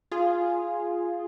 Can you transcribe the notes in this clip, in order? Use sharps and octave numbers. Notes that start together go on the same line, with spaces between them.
F4 G#4